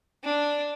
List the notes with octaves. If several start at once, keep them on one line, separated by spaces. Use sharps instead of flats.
D4